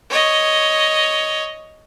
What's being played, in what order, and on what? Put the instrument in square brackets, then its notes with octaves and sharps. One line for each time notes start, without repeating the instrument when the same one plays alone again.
[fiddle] C#5 D#5